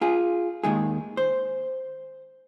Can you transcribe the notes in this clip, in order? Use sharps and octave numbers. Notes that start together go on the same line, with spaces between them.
F4 G#4
D#2 D#3 G#3 G#4
C5